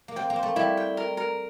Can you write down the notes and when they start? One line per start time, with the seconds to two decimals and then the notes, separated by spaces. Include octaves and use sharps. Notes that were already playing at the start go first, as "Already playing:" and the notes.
0.08 A#3
0.16 C4 G5
0.30 A#3
0.36 C5
0.43 A3
0.56 G3 E4
0.77 G5
0.97 A#4
1.17 A#4